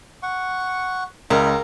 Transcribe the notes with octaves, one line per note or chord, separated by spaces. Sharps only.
F#5 C#6
C#2 E4 A#4 D#5 B5